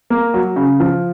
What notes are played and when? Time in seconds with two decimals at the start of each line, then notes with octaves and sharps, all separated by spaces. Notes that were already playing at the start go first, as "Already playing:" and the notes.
0.10 A#3
0.34 F#3
0.56 C#3
0.80 F3